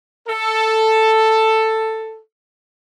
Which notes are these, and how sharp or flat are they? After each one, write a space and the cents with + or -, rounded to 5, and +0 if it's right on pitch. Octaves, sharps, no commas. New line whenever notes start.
A4 +5